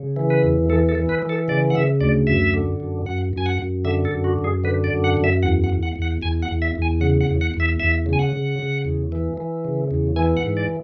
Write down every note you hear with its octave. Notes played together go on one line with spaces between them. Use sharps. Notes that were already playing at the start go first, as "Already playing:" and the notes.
Already playing: C#3
E3
B4
E2
E3 A4
A4
E3
B4
E3
A4
C#3 D5
F#5
C#3 E5
D2 D5
F#2 E5
D3
F#2
F#2 F#5
F#2 G#5
F#5
F#2
D3 E5
A4
F#2
F#4
F#2
G#4
D3 B4
D5
F#2
F#5
F#2
E5
E2 F#5
F#5
E2
F#5
E2
F#5
E2 G#5
F#5
E2
E5
E2
G#5
C#3 F#5
F#5
E2
F#5
E2
E5
E2 E5
C#3
G#5
F#5
C#3
C#3
E2
E3
E3
C#3
E2
E3 G#5
F#5
G#2
D5